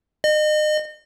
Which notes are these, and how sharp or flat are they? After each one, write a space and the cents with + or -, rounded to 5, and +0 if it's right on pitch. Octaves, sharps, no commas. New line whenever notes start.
D#5 -35